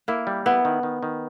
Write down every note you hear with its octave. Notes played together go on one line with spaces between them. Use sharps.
A#3 E4
G3
B3 E4
D#3
D#3
D#3